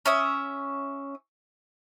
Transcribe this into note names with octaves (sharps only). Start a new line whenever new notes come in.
C#4 E5 D#6